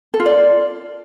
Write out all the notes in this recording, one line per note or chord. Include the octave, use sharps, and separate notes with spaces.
A4
F4
D5